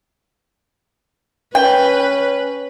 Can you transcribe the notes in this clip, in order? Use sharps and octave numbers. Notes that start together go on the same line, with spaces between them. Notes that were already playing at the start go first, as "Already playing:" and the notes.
C#4 B4 G5